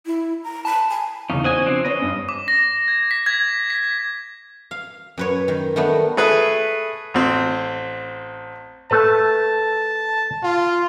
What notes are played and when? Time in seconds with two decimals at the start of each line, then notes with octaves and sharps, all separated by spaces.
0.06 E4
0.44 A#5
0.65 A5 B5
0.90 G#5
1.30 E2 C#3 C#4 D#4 F5
1.44 C#4 F#4 C5 D#5 G#5
1.66 F3 C4 D4
1.85 C#4 B4 C#5 D#5 A#6
2.02 G2
2.29 D6
2.48 A#6
2.88 G#6
3.11 B6
3.26 G#6
3.70 B6
4.71 F5
5.18 F#2 B4 C#5
5.48 D#3
5.76 D#3 G3 A3 B3 D4 B4
6.17 A3 G#4 B4
7.14 A1 C4
8.91 A3 A4 B4 A5
10.43 F4